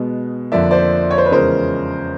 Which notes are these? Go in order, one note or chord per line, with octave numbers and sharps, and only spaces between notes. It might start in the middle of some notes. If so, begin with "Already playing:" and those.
Already playing: B2 G#3 B3
F2 D3 F3 A#3 D5 E5
C5 D5
C#5
C5
B4
E2 C#3 F3 G#3 C#4 A#4 C5